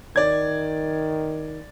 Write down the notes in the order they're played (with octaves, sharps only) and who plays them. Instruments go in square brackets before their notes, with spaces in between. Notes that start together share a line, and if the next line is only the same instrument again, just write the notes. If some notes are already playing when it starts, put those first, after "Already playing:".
[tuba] D#3 [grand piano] D5 G#6